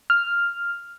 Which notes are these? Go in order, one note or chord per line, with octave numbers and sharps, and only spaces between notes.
F6